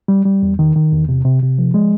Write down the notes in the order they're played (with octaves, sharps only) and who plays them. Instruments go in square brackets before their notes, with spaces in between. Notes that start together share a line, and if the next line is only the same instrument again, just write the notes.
[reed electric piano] G3
G3
E2
D#3
D#3
E2
C3
C3
C3
F3
G#3